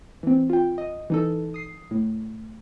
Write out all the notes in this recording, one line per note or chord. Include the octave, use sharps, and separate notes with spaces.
E3 C4
F4 G5
D#5
E3 D#4 A4
D#6 C7
A2